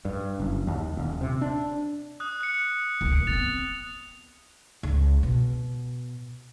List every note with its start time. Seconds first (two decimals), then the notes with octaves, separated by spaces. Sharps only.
0.05 G2
0.40 F#1
0.67 D#2
0.97 D#1
1.21 C3
1.41 D4
2.20 D#6 F#6
2.41 F#6 C#7
3.01 D#1 D2
3.27 B3 C4 F#6 A6 F7
4.83 C#2
5.23 B2